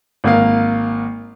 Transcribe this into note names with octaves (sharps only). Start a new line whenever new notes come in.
G#1 A#3 F5